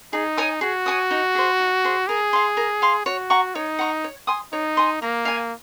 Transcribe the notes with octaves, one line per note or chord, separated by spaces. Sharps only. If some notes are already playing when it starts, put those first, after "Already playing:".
D#4 G#4
C#5 G#5 D#6
F#4 G#4
C#5 G#5 D#6
D#4
G#4 C5
D#4
G#4 C5
G#4 A#4
F5 C6
A#4
F5 C6
F#4 C#5
F#5 A#5 C#6
D#4 C#5
F#5 A#5 C#6
C#5
G#5 C6 D#6
D#4 C#5
G#5 C6 D#6
A#3 A#4
F5 G#5